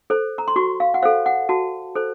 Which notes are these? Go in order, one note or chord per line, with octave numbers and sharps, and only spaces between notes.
A4 C5
A#5
C6
F#4 C#6
F5
F#5
A4 C5 F5
F#5
F#4 A5
A4 C5